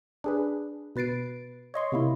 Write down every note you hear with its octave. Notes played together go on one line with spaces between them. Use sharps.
D4 G#4 B4
B2 B4 A6 C7 D7
C#5 D#5 C6 C#6
C3 A#3 E4